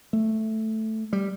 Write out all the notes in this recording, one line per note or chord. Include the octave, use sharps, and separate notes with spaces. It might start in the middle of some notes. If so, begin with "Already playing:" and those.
A3
G3